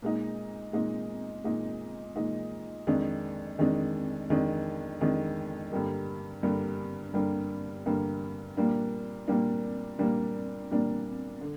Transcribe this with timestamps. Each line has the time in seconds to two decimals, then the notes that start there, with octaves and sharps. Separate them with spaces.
0.02 A#2 G#3 D#4
0.73 A#2 G#3 D#4
1.44 A#2 G#3 D#4
2.15 A#2 G#3 D#4
2.87 F2 D#3 G#3 D4
3.59 F2 D#3 G#3 D4
4.30 F2 D#3 G#3 D4
5.01 F2 D#3 G#3 D4
5.72 G2 D3 G3 A#3
6.43 G2 D3 G3 A#3
7.14 G2 D3 G3 A#3
7.86 G2 D3 G3 A#3
8.57 A#2 G3 A#3 D4
9.28 A#2 G3 A#3 D4
9.99 A#2 G3 A#3 D4
10.71 A#2 G3 A#3 D4
11.41 D3